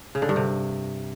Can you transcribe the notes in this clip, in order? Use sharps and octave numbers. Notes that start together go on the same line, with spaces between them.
C#3
D3
G2
C3